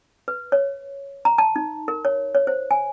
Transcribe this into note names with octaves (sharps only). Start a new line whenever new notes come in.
B4
C#5
A#5
A5
D#4
A#4
C#5
C#5
C5
G#5